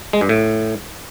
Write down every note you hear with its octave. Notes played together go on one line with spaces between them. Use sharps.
G#3
G2
A2